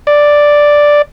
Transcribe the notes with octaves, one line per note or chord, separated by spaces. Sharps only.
D5